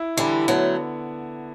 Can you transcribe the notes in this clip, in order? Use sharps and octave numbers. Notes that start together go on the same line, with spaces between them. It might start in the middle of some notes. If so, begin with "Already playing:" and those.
Already playing: E4
D3 E3 G3
F#3 A3 B3